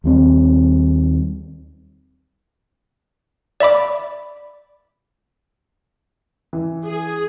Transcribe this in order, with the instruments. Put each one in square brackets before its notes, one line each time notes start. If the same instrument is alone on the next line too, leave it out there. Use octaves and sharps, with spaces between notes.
[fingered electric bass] D#2 G3 C4
[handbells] D5 E5 B5 D6
[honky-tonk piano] E3
[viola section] G#4